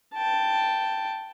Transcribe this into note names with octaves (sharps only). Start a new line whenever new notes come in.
G5 A5